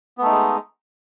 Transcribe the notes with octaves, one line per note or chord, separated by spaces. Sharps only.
G#3 A3 B3 D#4